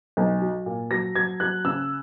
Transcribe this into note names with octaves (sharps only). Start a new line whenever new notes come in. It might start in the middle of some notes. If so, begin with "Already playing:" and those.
B1
F#3
A#2
F#3 A#6
F#3 G#6
F#3 F#6
C#3 E6